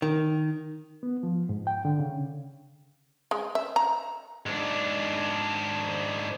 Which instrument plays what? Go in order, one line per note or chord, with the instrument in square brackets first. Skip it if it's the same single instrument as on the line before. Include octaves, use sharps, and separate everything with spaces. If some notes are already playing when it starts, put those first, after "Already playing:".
[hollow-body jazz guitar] D#3
[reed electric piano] B3
F3
G#2
G5
D3
C#3
[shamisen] G#3
E5
A#5
[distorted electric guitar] G#2 D4